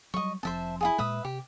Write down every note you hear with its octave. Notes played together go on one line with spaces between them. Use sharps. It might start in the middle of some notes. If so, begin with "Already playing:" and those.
F#3 G3 D#5 C#6
F1 F3 C4 C5 E5 A5
E4 F4 G#4
A#2 G#3 B4 E5 D#6
C3 G4